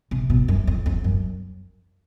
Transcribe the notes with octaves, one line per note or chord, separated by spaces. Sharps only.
C3
B2
F#2
F2
F2
F#2